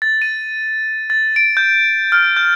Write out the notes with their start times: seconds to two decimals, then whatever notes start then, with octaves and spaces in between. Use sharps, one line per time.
0.02 A6
0.22 D#7
1.10 A6
1.36 D7
1.57 G6
2.12 F6
2.37 G6